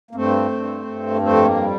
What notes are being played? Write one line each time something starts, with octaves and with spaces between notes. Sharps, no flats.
A#3
G2 A3 C4
G2
G2
F2 A3 C4
A#3
G3